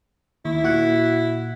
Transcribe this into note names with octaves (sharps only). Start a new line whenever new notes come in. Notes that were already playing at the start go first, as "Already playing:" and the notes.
D#2 E4
A#2 F#4 F#5